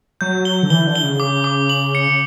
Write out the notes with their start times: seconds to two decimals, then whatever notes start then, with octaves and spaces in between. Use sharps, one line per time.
0.21 F#3 G6
0.45 G7
0.63 D3
0.70 E3 G7
0.87 D3
0.95 G7
1.03 C#3
1.20 D6
1.44 D6
1.69 F#7
1.95 C#7